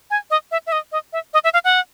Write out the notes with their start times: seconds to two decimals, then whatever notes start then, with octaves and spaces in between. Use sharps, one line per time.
0.11 G#5
0.30 D#5
0.51 E5
0.67 E5
0.72 D#5
0.92 D#5
1.13 E5
1.34 D#5
1.44 E5
1.54 F5
1.64 F#5